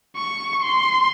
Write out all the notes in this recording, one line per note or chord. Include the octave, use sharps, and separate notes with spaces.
C#6
C6